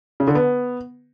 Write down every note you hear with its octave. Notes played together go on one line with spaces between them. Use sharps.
C#3
D3
B3